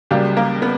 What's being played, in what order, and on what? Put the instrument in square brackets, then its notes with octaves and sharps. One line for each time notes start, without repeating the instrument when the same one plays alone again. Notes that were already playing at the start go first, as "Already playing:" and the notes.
[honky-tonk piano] C#2 C#3 F#3 G3 A#3 G4
A#3 A#4
B3 B4